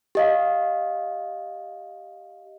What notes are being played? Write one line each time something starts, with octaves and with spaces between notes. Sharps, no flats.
G4 D#5 F5